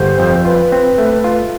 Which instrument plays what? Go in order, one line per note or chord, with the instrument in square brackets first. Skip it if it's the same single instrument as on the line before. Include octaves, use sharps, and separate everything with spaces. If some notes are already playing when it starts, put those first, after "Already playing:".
Already playing: [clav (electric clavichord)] G1 [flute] C5
[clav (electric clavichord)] F2
[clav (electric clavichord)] F4 [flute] B4
[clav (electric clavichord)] C4
A3
F4